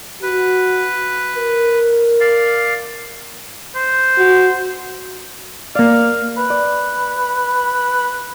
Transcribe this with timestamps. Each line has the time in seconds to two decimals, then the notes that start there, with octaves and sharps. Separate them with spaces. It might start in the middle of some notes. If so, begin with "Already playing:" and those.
0.23 F#4 B4
1.36 A#4
2.20 D5 F5
3.75 C5
4.18 F#4
5.75 A#3 D5 F5
6.37 B4
6.50 D5